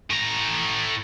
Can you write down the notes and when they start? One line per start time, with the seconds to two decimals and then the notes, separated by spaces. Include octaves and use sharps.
0.10 A2 A#5